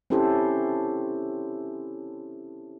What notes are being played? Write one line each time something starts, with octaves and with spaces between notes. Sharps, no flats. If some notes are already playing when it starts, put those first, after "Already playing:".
C4 C#4 E4 G4 A4 C5